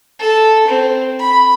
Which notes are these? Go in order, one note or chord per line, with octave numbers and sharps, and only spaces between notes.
A4
C4
B5